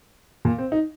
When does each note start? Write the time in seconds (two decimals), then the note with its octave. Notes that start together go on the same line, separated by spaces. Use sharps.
0.45 A#2
0.58 C4
0.72 D#4